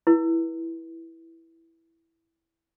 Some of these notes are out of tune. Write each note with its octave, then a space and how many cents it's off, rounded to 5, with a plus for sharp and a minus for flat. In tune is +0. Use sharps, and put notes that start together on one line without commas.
E4 +0 B4 -35